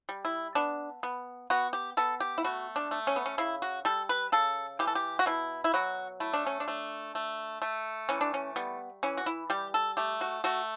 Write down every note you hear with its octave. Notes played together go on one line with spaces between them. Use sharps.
G3
E4
B3 D4
B3
B3 F#4
G4
B3 A4
G4
E4
A3 F#4
D4
A3
C#4
B3
C#4
C#3 E4
F#4
G3 A4
B4
C#3 A4
E3 G4
A4
G4
F#4
B2 E4
E4
F#3 F#4
A3 E4
D4
C#4
D4
A3
A3
A3
E3 C#4
D4
C#4
G3 B3
E3 C#4
F#4
E4
G3 G4
A4
A3 G4
F#4
A3 F#4